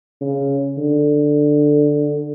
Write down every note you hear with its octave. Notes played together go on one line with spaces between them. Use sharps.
C#3
D3